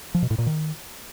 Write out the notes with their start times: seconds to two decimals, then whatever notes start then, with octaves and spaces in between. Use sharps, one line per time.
0.14 F3
0.22 B2
0.30 A2
0.38 A#2
0.46 D#3